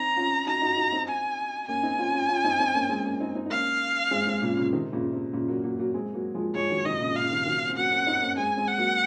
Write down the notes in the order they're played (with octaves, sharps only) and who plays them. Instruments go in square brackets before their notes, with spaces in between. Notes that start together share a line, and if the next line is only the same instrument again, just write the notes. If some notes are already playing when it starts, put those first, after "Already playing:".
Already playing: [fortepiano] C4 D#4 [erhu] A#5
[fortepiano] C#4 F4
[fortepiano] D#4 F#4 [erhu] A#5
[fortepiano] D#4 F#4
D#4 F#4
C4 D#4
[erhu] G#5
[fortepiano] A#3 C#4 [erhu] G#5
[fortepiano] C4 D#4
C#4 F4
C#4 F4
C#4 F4
C4 D#4
C4 D#4
A#3 C#4
G#3 C4
A#3 C#4
C4 D#4
C4 D#4
D#4
[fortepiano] A#3 C#4 [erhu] F5
[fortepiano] G#3 C4
G#3 C4
A#2 C#3
A#2 C#3
C3 D#3
A#2 C#3
C3
A#2 C#3
F#3 A#3
F#3 A#3
F#3 A#3
G#3 C4
F#3 A#3
F3 G#3
[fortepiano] F3 G#3 [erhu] C#5
[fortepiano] D#3 F#3
[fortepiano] C3 D#3 [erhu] D#5
[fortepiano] A#2 C#3
[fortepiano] A#2 C#3 [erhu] F5
[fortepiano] C3 D#3
D#3 F#3
C#4
C4
[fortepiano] F#3 A#3 [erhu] F#5
[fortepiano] A#3 C#4
C4 D#4
A#3 C#4
[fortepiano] G#3 C4 [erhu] G#5
[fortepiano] G#3 C4
[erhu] F#5
[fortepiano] F#3 A#3